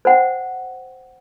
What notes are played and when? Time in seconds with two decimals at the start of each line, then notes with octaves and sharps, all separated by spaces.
0.05 C5 F#5 G5